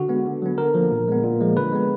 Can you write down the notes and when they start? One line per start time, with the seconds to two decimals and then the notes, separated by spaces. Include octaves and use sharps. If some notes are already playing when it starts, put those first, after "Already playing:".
Already playing: D3 F#4
0.09 G#3 B3
0.26 D3
0.42 F#3 B3
0.58 D3 A#4
0.74 F3 A#3
0.92 A#2
1.08 G#3 B3
1.24 A#2
1.40 F3 G#3
1.56 D3 B4
1.73 G#3 B3